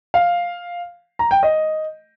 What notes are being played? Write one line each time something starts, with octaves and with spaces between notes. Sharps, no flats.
F5
A#5
G5
D#5